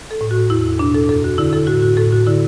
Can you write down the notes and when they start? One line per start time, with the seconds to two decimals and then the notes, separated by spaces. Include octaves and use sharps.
0.11 A4
0.21 A2
0.31 F#4
0.50 E2 E4
0.79 B2 D4
0.95 A4
1.09 F#2 A4
1.24 F#4
1.38 D3 E4
1.53 A4
1.67 A2 F#4
1.82 F#4
1.97 A2 A4
2.12 F#4
2.27 D3 E4